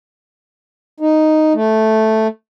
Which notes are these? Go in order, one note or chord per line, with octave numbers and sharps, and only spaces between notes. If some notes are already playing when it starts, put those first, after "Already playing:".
D#4
A3